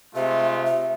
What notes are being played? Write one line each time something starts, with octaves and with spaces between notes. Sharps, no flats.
C3 G#3 A3 F4 E5
E5